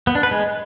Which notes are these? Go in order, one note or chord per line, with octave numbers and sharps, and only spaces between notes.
B3
D4
B4
G#3